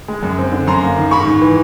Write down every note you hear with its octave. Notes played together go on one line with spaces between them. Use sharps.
G#3
F#2
C4
D3
F#2 A#5 C6
A#3
D#3
G#2 B5 C#6
G#2
E3